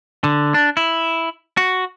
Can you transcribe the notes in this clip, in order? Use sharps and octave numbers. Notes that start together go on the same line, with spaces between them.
D3
D4
E4
F#4